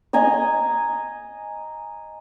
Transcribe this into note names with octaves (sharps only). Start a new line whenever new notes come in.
D#5 G#5 A#5 D#6